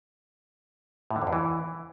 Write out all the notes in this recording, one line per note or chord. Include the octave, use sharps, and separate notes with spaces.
A2
D3
F2
E2
E3